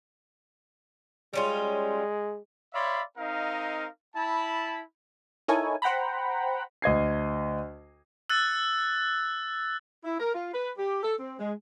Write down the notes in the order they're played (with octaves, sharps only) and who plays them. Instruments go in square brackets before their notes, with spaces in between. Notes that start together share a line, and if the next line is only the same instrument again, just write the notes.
[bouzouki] G3 C#4 F4 [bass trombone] G#3
[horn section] C#5 D5 E5 F5 B5 C6
C4 D#4 A#4 D#5 F5
E4 A5 B5
[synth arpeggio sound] D#4 E4 A4 A#4 C#5 G#5
C5 F#5 G5 A#5 B5
[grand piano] D2 D#5 G#6 C7
[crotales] E6 F#6 A6
[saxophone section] E4
A#4
F4
B4
G4
A4
C4
G#3